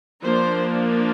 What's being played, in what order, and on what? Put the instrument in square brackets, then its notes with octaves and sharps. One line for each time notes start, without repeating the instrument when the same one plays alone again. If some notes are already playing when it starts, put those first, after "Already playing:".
[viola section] F3 A#3 D4 C5